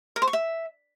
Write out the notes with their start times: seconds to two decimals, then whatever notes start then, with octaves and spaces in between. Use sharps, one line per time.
0.16 A#4
0.22 C5
0.28 C#6
0.33 E5